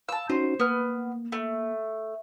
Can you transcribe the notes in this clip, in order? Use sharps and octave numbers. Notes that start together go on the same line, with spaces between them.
F5 A5 E6
C#4 D#4 F#4 C5
A#3 B3 F6
A3